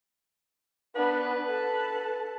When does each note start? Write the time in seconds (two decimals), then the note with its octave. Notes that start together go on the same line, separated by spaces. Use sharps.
0.95 B3 D4 B4
1.49 A4 A5